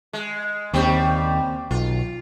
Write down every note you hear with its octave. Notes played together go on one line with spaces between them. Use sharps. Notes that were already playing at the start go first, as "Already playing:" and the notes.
G#3
D#2 C#3 G3 C4
B1 F4